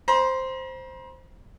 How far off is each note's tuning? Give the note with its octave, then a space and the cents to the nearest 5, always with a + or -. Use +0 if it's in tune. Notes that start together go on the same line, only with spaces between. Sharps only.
C5 +0 A#5 +45